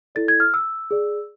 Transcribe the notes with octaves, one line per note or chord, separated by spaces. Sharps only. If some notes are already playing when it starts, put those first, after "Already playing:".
E4 A4 D5 A6
G#6
F6
E6
G#4 D5